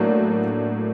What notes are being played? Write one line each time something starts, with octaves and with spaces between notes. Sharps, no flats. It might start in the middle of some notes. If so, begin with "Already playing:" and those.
Already playing: A2 F#3 A#3 D4